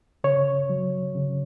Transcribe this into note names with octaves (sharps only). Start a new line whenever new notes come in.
C#3 C#5
F#3
C#3